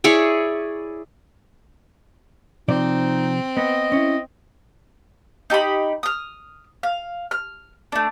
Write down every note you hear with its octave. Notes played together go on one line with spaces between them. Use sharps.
E4 G#4 C#5 D5
C3 F3 C4 D#4 D5
B3 D#5
C#4 E4
D#4 G4 A#5 B5
D#6 F6
F5
F6
A3 D4